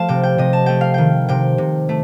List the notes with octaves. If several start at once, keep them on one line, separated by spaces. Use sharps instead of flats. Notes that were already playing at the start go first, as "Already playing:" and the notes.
Already playing: F3 A3 F5 A5
C3 G5
G5
C3 D#5
A5
A3 G5
F5
D#3 G5
C3 G5
C3
A3